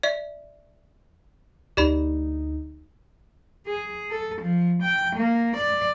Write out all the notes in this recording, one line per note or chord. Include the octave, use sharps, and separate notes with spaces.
D5 E5
D2 D#4 G4 D5 B5
G#4
A4
F3
G5
A#3
D5